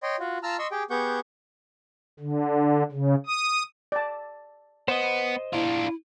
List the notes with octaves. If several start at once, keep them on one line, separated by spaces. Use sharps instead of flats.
C#5 D#5 G5 C6
F4 F#4
F4 A5 A#5 E6 F6
D#5 C6 C#6 E6
G4 G#4 G5
B3 G4 G#4 F#5 C#6 G6
D3
C#3
D#6
D5 A5
B3 C5 D#5
D4 E4 F4